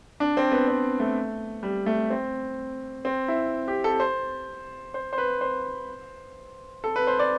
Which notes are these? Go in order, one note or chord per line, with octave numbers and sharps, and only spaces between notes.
D4
C4
B3
C4
A3
G3
A3
C4
C4
E4
G4
A4
C5
C5
C5
B4
C5
A4
B4
C5
D5